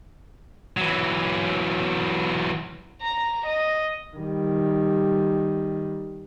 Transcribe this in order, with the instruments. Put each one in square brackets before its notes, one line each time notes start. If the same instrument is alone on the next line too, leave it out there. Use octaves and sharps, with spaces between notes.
[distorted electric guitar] E3 F#3
[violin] A#5
D#5
[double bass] D#3 G3